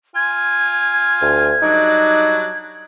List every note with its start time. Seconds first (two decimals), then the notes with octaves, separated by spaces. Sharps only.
0.15 F4 G#5 G#6
1.21 D2
1.62 F#3 G3 D4 D#4